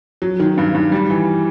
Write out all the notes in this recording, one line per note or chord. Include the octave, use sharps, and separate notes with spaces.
F#3
D#3
G2
G2
G3
E3